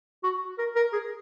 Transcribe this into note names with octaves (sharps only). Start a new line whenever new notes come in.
F#4
A#4
A#4
G#4